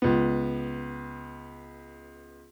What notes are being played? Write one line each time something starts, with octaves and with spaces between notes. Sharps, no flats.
C#2 B3